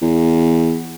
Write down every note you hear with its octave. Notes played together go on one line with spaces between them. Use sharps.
E2